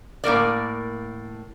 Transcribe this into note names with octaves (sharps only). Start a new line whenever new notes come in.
A2 A#3 A#4 D5